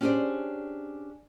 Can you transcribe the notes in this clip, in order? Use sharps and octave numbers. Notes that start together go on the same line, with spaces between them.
C#4 D4 G4 G#4 C5 D5